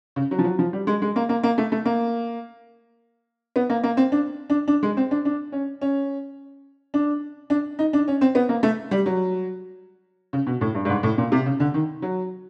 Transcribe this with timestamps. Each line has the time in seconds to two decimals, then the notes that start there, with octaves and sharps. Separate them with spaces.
0.16 C#3
0.31 F#3
0.39 F3
0.44 F#3
0.59 F3
0.73 G3
0.87 G#3
1.02 G#3
1.16 A#3
1.29 A#3
1.43 A#3
1.58 A3
1.72 A3
1.85 A#3
3.56 B3
3.70 A#3
3.84 A#3
3.97 C4
4.12 D4
4.50 D4
4.68 D4
4.83 G#3
4.97 C4
5.11 D4
5.25 D4
5.52 C#4
5.81 C#4
6.94 D4
7.50 D4
7.79 D#4
7.93 D4
8.08 C#4
8.21 C4
8.35 B3
8.49 A#3
8.63 A3
8.91 G3
9.06 F#3
10.33 C#3
10.47 B2
10.61 A2
10.75 G2
10.85 G2
10.89 G#2
11.03 A2
11.18 A#2
11.32 C3
11.46 C#3
11.60 D3
11.74 D#3
12.02 F#3